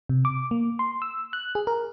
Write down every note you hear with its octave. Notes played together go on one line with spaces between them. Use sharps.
C3
D6
A#3
C6
E6
F#6
G#4
A#4